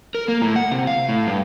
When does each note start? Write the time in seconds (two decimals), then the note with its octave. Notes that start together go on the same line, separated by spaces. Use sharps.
0.15 A#4
0.28 A#3
0.42 A2
0.56 F#5
0.72 C3
0.87 F5
1.09 A2
1.27 G2